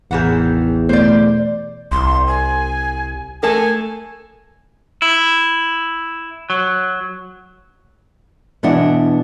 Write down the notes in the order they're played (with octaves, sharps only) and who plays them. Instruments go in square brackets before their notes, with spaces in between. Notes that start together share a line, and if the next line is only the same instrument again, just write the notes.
[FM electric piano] A1 G#4 [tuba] E2 [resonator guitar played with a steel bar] D#3 E3 F#5
[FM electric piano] B2 A3 [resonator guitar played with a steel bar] C5 D5
[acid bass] C2 [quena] C6
[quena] G#5
[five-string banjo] A3 A4 A#4 [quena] G#5
[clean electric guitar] E4
F#3
[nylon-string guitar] B2 E3 D4 F#5